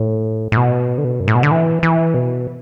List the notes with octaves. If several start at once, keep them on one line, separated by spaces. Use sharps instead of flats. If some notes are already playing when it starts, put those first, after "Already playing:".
Already playing: A2
A2
B2
D3
B2
F#2
A2
B2
D3
E3
E3
B2